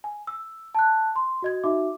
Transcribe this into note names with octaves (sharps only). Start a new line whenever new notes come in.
G#5
E6
A5 F#6
C6
F#4 D#5 G#6
D#4 F#4 E5 D6